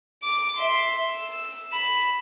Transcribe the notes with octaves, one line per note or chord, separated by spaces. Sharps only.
D6 D7
E5 C6
E6
B5 E7